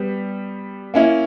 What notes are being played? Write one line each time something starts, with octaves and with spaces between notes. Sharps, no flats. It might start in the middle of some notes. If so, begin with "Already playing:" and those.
Already playing: G3 B3 G4
A#3 C#4 E4